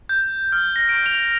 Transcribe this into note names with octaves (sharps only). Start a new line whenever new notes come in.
G6
F6
A#6
D7
F7